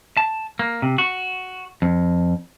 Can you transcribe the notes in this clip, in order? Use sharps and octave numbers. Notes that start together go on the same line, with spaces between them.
A5
A#3
C3
F#4
F2